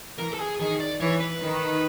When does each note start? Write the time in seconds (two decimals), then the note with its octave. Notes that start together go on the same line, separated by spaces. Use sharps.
0.20 E3 A#4
0.34 A4
0.40 G#4
0.60 D#3 G#4
0.81 D5
1.00 E3 C#5
1.20 B4
1.41 D#3